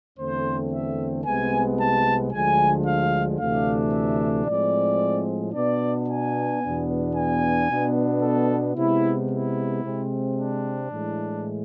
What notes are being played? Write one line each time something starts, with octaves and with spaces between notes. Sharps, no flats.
E2 D3 A3 C4 C5
E5
C2 C3 G#3 B3 G#5
A5
D2 D3 F3 G#3 G#5
F5
D2 C3 E3 A3 D4 F5
E5
A2 F3 G#3 C4 D5
B2 B3 D4 D5
G#5
E2 B2 B3 D4
G#5
B2 B3 D4
A4
C3 G#3 B3 E4
E4
C3 G#3 C4
D4
A2 E3 G#3